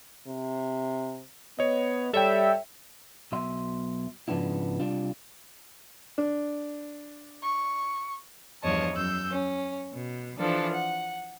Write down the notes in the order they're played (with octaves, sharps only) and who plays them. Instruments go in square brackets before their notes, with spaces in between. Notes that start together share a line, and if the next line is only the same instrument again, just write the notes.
[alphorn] C3
[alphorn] B3 [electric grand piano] C#5 D#5
[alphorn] G3 [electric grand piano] A4 C#5 G5 [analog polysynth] E5
[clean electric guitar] B1 B2 E5 C6
G#2 C#3 F3 B3 D4 E4
C3 G3 D4 F4
[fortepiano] D4
[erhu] C#6
[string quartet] E2 G2 F3 C#5 D#5 A5
F#2 E6 G6
C#4
B2
E3 F3 D4 A4
F#5